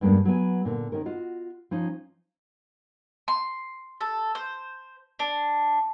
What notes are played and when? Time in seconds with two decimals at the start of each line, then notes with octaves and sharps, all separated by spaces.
0.01 E2 G2 G#3 A#3 D4
0.25 F#3 B3 G#5
0.65 A#2 D3
0.92 D#3 C#4 A#4
1.05 F4 F#4 D#5
1.71 F3 C#4 D#4
3.28 C6
4.01 A4
4.35 C5
5.19 D4